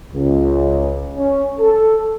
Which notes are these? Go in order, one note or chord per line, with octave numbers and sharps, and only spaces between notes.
C#2
C#4
A4